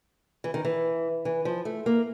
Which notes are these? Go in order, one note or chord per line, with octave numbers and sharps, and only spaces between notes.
E3
D#3
E3
E3
F3
A3
A#3